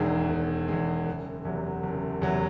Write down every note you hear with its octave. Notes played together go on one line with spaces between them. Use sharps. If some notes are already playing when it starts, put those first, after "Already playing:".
Already playing: E1 E2 D#3 G#3
E1
E2 D#3 G#3
F#1
E2 C3 F#3
F#1
E2 C3 F#3